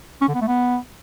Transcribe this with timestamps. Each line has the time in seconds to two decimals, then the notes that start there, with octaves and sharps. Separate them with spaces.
0.21 C#4
0.28 D3
0.35 B3
0.41 A3
0.48 B3